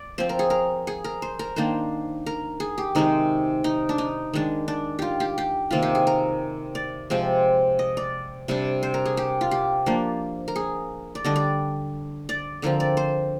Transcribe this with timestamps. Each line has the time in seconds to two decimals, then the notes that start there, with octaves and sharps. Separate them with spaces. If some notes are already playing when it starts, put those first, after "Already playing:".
Already playing: D5
0.18 F3 C4 C5
0.29 A#4
0.39 G#4
0.50 A#4
0.87 G#4
1.04 A#4
1.22 C5
1.39 A#4
1.56 D#3 A#3 D4 C5
2.26 A#4
2.60 G#4
2.78 G4
2.95 C3 D#3 G#3 C4 D#4
3.64 D#4
3.89 D4
3.98 D#4
4.34 D#3 G#3 D4
4.68 D4
4.99 F4 G4
5.20 G4
5.38 G4
5.71 C3 D#3 A#3 F4
5.82 G4
5.95 G#4
6.07 A#4
6.75 D5
7.10 C3 F3 G#3 C4
7.79 D#5
7.97 D5
8.48 C3 G3 D4
8.83 C5
8.94 A#4
9.06 G#4
9.17 G4
9.41 F4
9.51 G4
9.86 F3 A#3 D4
10.48 A#4
10.56 G#4
11.15 D5
11.24 D3 G3 D4 D#5
11.36 D5
12.29 D5
12.62 D3 F3 C4 A#4
12.80 D5
12.97 C5